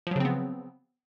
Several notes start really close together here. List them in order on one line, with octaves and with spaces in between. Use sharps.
F3 F#3 C#3 C4 B3